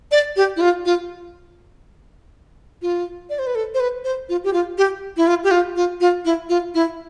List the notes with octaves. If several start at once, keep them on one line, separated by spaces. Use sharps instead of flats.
D5
G4
E4
F4
F4
F4
D5
C5
B4
A4
C5
B4
C5
F4
G4
F4
G4
E4
F4
G4
F4
F4
F4
E4
F4
E4